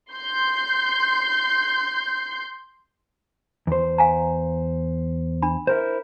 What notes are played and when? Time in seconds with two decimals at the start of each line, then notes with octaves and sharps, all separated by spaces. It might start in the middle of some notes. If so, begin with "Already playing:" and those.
0.13 C6 G6
3.67 E2 C5
3.98 F5 G#5 A#5
5.42 D4 B5
5.67 E4 A#4 C5